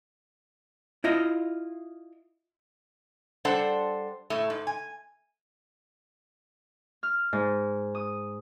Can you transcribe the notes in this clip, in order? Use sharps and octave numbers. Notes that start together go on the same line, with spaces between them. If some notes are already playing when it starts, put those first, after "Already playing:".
E4 F4 D#5
G3 D4 A4 C5 F#5
A2 A3
G#2
G#5
F6
G#2
D#6